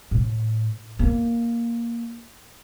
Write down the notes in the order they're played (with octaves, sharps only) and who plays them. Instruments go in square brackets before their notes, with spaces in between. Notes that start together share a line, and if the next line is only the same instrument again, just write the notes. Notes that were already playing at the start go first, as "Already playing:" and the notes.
[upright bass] A2
A#3